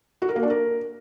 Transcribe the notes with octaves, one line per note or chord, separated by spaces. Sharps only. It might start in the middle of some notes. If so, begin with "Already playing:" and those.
F#4
A#4
A#3
D4
A#4